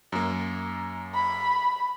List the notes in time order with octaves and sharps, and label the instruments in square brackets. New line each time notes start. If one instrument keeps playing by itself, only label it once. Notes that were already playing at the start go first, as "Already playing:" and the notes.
[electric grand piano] F#2 A#3
[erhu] B5